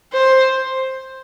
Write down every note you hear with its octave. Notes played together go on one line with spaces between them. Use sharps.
C5